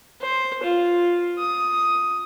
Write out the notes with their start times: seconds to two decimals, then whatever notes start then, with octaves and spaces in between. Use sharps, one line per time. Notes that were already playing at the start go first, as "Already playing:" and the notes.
0.21 C5
0.63 F4
1.38 D#6